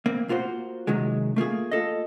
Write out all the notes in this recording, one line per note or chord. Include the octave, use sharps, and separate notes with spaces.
A#3 C4
A#3 F4 F#4 A#4 C5
C3 D#3 F#3 G#3
A3 A#3 F4 G#4
F4 A4 D#5